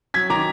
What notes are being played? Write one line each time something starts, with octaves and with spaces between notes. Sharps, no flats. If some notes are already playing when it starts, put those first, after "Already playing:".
F#3 G#6 B6
D#3 A#5 D6